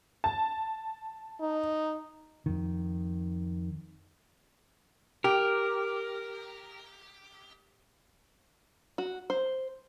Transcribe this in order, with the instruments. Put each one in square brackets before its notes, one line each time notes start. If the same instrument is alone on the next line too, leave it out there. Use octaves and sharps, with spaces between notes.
[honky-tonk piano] A5
[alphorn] D#4
[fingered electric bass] F2 D#3
[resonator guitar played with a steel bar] G4 [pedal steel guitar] A#4
[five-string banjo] F#4
C5